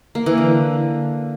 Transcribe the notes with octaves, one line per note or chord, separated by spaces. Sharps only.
A#3
E3
D3